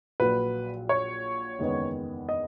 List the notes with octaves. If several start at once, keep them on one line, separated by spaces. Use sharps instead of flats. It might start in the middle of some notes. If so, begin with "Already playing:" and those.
A#1 A#2 F#3 B4
C#5
F#1 E2 D#3 G#3 B3
D#5